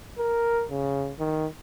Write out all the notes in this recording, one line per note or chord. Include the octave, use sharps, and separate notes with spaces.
A#4
C#3
D#3